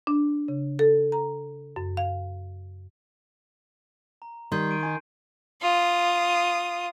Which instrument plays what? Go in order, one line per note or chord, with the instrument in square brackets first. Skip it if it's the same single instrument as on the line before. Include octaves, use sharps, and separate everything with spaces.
[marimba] D4
C#3
A4
A#5
F#2
F5
[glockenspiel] A#5
[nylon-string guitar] D#3 [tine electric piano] G3 [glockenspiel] C6 G6 C7
[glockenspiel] D7 D#7
[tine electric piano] D#4 G#5
[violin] F4 D#6